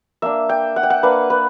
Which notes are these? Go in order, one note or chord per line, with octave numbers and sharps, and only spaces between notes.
A#3 D4 E5
G5
F#5
G5
F#5
A#3 D4 B4
B4